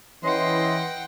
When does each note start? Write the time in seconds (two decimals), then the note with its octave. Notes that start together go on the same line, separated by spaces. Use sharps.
0.24 E3 C#4 D#5 F#5 G5 C6